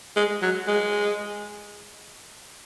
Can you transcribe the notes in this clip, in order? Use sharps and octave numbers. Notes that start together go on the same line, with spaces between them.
G#3
F#3
G#3